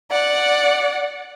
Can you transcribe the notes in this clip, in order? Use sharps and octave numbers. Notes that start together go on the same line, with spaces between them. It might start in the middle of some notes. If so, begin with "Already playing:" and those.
D5 F#5